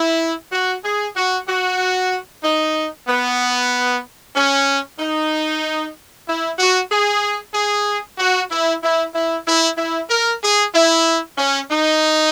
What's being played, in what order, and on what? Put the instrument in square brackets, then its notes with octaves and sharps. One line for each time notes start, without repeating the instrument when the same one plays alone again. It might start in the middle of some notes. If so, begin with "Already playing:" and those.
Already playing: [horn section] E4
F#4
G#4
F#4
F#4
D#4
B3
C#4
D#4
E4
F#4
G#4
G#4
F#4
E4
E4
E4
E4
E4
A#4
G#4
E4
C#4
D#4